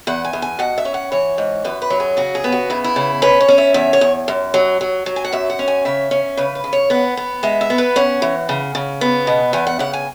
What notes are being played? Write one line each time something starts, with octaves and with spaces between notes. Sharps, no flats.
E2 F#5
G#5
E2
G#5
B2 F#5
E5
C#4
F#5
E3 C#5
G#2
F#2 B4
B4
F#3
G#4
C#3 F#4
G#4
B3
F#4
C#3 E4
E4
C#3
C#4 B4
C#5
C#4
E5
E2 E5
C#5
E2
F#2
F#3
F#3
F#3
G#5
F#5
F#2 E5
F#5
C#4
G#5
C#3 E5
C#4
C#3 B4
B4
C#3
C#5
B3 F#5
B3
G#3 E5
E5
B3
B4
C#4 F#5
E3
C#3
C#3
B3
B2
E2 G#5
F#5
C#3 F#5
G#5